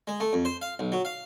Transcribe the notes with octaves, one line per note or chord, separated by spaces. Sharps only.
G#3
A3
F2
C5
F5
B1
F#3
F5